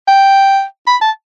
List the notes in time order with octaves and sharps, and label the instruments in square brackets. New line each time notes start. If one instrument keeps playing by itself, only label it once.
[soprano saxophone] G5
B5
A5